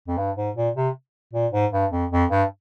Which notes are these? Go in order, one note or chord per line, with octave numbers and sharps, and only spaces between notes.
F2
G2
G#2
A#2
C3
A#2
G#2
G2
F2
F2
G2